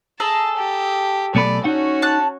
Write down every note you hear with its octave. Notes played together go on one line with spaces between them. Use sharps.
G#4 A4 A5 A#5
G4
B1 A3 D5 B5
C#4 D#4 F#4 F#5
A5 F#6